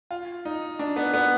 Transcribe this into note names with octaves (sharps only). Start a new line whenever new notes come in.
F4
D#4
D4
B3
B3